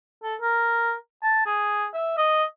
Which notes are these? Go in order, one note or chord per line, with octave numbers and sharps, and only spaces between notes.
A4
A#4
A5
G#4
E5
D#5